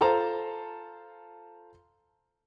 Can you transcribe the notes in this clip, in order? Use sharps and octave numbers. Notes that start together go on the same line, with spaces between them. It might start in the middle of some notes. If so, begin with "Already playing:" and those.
F4 A4 C5 A5 A#5